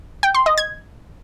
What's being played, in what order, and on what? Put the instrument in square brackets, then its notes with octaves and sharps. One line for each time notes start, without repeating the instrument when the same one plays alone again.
[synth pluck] G5
C6
D#5
G#6